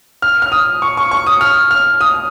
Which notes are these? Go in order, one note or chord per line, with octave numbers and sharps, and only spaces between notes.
F6
F6
D#6
C#6
C#6
C#6
D#6
F6
F6
D#6